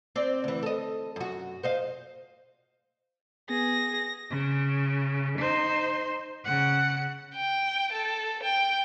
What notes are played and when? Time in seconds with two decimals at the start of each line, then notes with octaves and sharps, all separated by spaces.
0.16 C4 D5
0.44 D2 E3
0.63 A4 D#5
1.16 F#2 F#4
1.63 C5 D#5 F5
3.49 B3 G#4 A#6
4.31 C#3
5.39 D#4 C5
6.44 C#3 F#5
7.34 G5
7.92 A4
8.43 G5